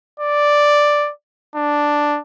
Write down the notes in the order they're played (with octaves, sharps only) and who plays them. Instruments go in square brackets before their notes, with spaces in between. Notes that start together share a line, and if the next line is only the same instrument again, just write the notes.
[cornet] D5
D4